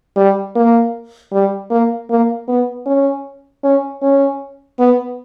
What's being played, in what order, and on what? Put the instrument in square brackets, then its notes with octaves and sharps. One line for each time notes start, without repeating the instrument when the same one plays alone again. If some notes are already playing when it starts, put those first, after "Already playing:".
[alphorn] G3
A#3
G3
A#3
A#3
B3
C#4
C#4
C#4
B3